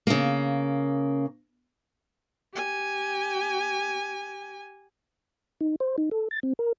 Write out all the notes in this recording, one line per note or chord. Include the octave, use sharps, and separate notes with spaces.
C#3 A#3
G4 G#5
D#4
C5
D#4
A4
A6
C4
A#4